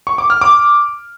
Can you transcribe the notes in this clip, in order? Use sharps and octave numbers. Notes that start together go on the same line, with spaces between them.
C#6
D6
F6
D6